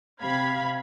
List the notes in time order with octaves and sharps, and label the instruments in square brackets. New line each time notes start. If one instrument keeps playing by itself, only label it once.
[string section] C3 F5 B5 G#6